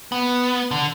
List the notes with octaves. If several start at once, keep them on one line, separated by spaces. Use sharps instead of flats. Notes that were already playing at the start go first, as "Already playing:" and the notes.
B3
D3